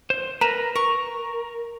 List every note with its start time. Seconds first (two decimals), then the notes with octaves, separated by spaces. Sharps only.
0.10 C5
0.41 A#4 B4 A#5 E7
0.76 A#4 C#6